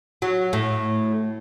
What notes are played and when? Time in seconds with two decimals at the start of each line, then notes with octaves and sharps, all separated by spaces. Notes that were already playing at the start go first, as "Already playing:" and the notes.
0.22 F#3
0.53 A2